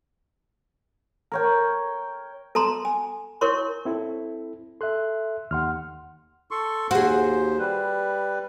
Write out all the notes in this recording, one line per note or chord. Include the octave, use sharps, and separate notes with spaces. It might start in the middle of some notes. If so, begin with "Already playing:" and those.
A#4 C#5 G5
A4 A5 A#5 C6
G#5
E4 A#4 C#5 C6 C#6
C4 E4 A4
A4 E5 C6 F#6
D#2 F#5 C6 F6
A4 C6 C#6
D#2 F#4 G#4 C5
G3 B4